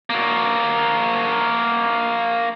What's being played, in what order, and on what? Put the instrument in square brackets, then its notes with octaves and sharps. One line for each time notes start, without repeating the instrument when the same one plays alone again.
[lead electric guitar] A#3 F#4